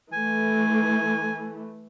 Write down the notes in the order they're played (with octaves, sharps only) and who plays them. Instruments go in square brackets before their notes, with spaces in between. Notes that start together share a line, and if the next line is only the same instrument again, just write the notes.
[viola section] E3 A3 [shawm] G#5